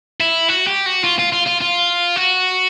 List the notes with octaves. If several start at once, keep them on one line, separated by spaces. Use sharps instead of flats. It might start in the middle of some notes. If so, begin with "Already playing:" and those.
E4
F#4
G4
F#4
F4
F4
F4
F4
F4
F#4